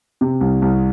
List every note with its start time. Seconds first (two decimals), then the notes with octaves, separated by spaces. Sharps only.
0.21 C3
0.41 C2
0.62 C2